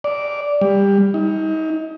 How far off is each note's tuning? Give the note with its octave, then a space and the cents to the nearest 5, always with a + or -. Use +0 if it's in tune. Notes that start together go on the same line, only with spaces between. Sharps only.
D5 -10
G3 +20
D#4 +35